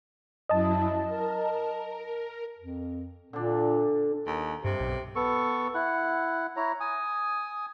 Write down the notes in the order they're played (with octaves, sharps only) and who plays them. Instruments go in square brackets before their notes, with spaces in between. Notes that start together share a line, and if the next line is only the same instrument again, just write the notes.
[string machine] F#2 F#3 E4 [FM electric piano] D#5 A5
[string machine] A#4
[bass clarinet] F2
[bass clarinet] A#2 [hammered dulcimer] D3 D4
[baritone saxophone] D#2
[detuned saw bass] G2 [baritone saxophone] C3
[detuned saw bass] B1
[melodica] B3 A4 C#6
E4 F#5
E4 C#5 A#5
G#5 D#6